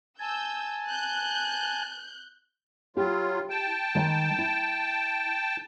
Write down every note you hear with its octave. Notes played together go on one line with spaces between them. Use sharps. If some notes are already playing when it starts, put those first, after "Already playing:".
G#5 A5 E6 G6
F#6 G6
F#3 E4 F4 G4
G5 A5
D#3 G#3 D#5
E4